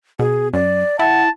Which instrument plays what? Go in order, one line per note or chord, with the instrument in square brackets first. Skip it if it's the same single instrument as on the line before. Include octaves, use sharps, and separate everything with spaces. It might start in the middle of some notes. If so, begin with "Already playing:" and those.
[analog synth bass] B2 [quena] G#4
[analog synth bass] F#2 [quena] D5
[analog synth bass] E4 [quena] F#5 [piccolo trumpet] A5